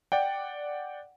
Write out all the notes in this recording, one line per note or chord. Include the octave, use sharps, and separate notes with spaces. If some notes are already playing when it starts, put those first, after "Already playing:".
D5 F#5 G5